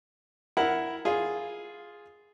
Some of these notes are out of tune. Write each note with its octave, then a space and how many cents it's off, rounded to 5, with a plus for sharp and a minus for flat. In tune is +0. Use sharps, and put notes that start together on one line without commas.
E4 +0 A#4 +5 F#5 +0
F4 +0 G#4 +0